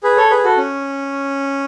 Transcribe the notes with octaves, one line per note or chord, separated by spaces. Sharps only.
G#4 B4
A4 C#5
G#4 B4
F#4 A4
C#4